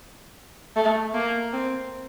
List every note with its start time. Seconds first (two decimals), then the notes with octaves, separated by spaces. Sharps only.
0.76 A3
1.14 A#3
1.53 C4